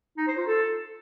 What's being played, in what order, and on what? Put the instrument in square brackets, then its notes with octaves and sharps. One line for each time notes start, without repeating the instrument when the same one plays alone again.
[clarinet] D#4
C5
F4
A4